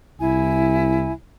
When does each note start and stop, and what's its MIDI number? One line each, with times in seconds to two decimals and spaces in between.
0.20 1.12 36
0.20 1.13 64
0.20 1.13 80